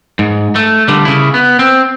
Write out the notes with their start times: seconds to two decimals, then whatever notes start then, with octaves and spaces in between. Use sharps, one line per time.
0.19 G#2
0.56 A3
0.88 D3 G3
1.05 C#3 E4
1.34 B3
1.59 C4